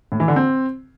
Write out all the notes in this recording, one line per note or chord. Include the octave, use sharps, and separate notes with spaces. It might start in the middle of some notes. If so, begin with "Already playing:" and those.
A2
E3
D3
C4